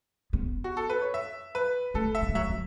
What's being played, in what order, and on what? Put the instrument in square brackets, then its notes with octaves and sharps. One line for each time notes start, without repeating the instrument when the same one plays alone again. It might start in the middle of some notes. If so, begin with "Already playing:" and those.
[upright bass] B3
[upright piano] F#4
A4
B4
C#5
E5
B4
[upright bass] A3 [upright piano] A4
[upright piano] E5
[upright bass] F#3
A3
[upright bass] F#3 [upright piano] E5
[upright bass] F#3